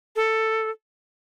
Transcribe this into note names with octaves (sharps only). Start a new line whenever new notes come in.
A4